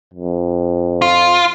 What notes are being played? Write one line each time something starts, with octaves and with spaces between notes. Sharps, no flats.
F2
F4